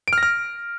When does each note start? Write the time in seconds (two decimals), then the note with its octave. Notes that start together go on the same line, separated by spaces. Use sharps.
0.08 D7
0.13 F6
0.18 A#6
0.23 F6